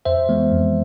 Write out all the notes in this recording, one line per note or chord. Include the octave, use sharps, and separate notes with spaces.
F2 C5 E5
E3 G#3 B3
F2